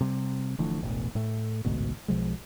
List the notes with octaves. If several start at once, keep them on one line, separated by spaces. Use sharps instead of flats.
C3 G3
D1 D2 E3 F3
E1 A1 E2
A2 A3
A1 D2 G#2 B2
B1 B2 F3 G#3